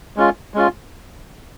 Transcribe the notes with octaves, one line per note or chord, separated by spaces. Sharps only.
G#3 C#4 F4
G#3 C#4 F4